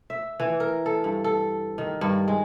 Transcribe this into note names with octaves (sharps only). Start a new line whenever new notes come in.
E5
E3
A#4
A4
G2
A4
D#3
G2
G#3